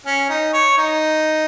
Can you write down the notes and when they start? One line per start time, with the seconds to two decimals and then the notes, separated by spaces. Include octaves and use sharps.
0.06 C#4
0.29 D#4
0.53 C#5
0.78 D#4